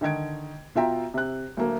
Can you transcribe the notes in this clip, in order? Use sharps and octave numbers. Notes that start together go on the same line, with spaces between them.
D3 D#3 D#5 G#6 D7
B2 F4 E5 G5 A#5
C3 F#6
D2 F#3 A3 A#3